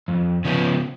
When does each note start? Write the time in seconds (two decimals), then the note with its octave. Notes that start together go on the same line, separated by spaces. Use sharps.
0.08 F2
0.45 C#3 F3 B3